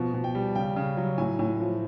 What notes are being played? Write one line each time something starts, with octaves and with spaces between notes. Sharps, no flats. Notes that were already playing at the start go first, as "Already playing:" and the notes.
Already playing: B2 F3
B2
G5
G3
C#3 G5
C#3
F#3
A2 G#5
A2
F3